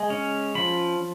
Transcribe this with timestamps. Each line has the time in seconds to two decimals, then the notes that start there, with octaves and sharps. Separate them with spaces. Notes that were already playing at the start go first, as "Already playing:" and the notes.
Already playing: G#3
0.10 C#4
0.55 F3 B5